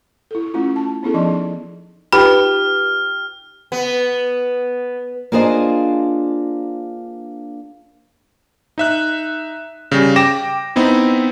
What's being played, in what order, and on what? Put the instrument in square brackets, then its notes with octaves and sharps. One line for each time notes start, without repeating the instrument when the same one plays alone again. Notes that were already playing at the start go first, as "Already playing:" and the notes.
[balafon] E4 A4
A3 C#4 E4 F4
A5
B3 C#4 D4 E4 G#4 A4
F3 D#4 D#5 A5
[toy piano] D#4 F4 B4 [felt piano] G4 [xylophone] B5 [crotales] F6
[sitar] B3
[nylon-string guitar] A#3 D4 F4 G#4 C5 D#5
[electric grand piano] D#4 E5 F#6
C#3 G3
G5 D6 A#6 E7
B3 C4 D#4 E4